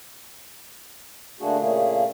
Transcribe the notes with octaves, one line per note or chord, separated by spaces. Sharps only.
D3 A3 A#3 D4 F#4 G#4
A#2 C#3 A3 A#3 G#4